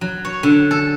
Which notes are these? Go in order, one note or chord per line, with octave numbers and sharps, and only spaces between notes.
F#3
C#5
D3
A4